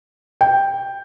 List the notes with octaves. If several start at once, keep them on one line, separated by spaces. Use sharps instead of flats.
G5